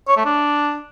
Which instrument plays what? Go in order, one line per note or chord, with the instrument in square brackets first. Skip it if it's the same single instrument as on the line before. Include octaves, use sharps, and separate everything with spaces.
[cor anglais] C#5
A3
D4